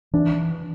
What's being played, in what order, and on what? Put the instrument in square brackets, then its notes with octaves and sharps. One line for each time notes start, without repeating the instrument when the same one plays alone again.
[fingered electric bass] E3 [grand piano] D4